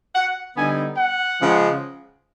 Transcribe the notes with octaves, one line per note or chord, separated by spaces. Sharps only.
F#5
D3 G3 B3 D#4 G#5
F#5
C#3 F3 G#3